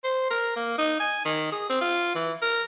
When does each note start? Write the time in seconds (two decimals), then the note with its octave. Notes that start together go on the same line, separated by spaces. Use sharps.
0.04 C5
0.31 A#4
0.56 A#3
0.78 D#4
1.00 G#5
1.25 D#3
1.52 G#4
1.70 C4
1.81 F4
2.15 E3
2.42 A#4